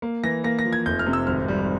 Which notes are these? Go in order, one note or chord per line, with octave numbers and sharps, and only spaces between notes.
A#3
E3 A#6
A#3 A#6
A#6
F3
G#6
F1 G6
F6
C3
E6
G#1 F6
G3